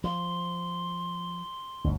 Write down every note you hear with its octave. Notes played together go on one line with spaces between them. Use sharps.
F3 C6
G1 D2